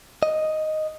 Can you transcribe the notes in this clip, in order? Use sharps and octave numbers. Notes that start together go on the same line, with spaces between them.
D#5